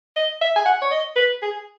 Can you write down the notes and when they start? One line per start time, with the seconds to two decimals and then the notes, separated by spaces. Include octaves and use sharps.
0.16 D#5
0.41 E5
0.56 G#5
0.65 F#5
0.82 C#5
0.91 D#5
1.16 B4
1.42 G#4